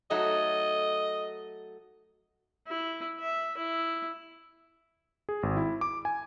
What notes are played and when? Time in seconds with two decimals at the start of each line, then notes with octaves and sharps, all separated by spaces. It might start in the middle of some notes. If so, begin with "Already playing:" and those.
0.10 F#3 A3 D#4 D#5
2.68 E4
3.20 E5
3.58 E4
5.29 G#4
5.43 G#1
5.57 E4
5.81 D6
6.05 G#5